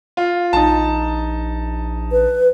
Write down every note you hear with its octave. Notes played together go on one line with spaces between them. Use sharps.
F4
A#1 D#4 A5
B4